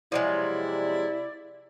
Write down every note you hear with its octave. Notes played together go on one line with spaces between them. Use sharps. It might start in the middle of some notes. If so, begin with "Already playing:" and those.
C3 F3 F#3 G#3 E4 D5